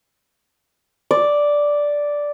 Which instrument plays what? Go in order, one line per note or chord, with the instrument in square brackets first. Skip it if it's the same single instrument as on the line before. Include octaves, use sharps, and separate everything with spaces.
[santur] D5